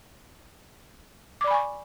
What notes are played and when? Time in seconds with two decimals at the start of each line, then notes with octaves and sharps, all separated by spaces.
1.41 D6
1.44 D5
1.47 B5
1.51 G#5
1.54 C#6